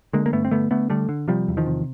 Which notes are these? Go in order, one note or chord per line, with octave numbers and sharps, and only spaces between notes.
D3 G#3 A#3
A#3
G2 A3 B3
C4
D3 A3 B3
D3 A3 B3
D3 G3 A3
D3
C3 F3 G3
E2
D#3 F3
C3